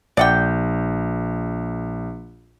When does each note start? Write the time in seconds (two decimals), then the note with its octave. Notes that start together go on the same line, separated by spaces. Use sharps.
0.17 A#1 D5 F#5 G5